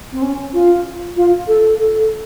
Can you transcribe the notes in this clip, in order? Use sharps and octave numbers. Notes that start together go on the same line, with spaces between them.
C4
C#4
F4
F4
A4
A4